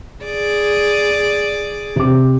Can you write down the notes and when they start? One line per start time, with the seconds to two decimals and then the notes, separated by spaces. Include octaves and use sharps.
0.24 G#4 D5
1.96 C3 D6